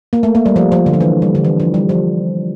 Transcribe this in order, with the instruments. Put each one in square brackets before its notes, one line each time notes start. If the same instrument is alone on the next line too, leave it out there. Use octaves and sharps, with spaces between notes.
[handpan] A#3
A3
A#3
G3
F3
F3
D3
F3
E3
G3
D3
E3
F3
G3
F3